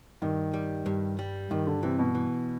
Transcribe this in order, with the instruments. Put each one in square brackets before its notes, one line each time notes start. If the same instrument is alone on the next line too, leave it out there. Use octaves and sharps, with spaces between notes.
[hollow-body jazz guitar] G2 [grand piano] D#3
[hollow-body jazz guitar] G3
G2
G3
[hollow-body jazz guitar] G2 [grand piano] D#3
[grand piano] D3
[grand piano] C3 [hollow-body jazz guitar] E3
[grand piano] B2
[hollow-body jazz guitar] E3